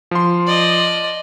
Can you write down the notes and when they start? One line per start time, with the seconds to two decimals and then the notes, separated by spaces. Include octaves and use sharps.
0.11 F3 C6
0.47 D5 D#5